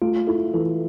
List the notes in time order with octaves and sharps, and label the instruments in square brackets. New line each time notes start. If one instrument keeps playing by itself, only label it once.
[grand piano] A3 [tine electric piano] F4
[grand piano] E4 [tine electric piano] A4
[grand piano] E3 [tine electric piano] A4